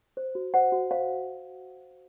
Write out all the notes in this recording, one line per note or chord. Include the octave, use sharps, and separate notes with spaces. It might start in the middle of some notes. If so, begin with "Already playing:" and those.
C5
F#4
C5 F#5
F#4
C5 F5